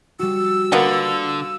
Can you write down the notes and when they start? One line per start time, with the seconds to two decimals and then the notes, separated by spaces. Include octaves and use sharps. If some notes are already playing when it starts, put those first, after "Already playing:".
0.19 G3 F#4 E6
0.72 D3 A#3 B3 F4